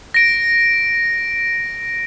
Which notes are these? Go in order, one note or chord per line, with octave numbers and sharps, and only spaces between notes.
A#6 D7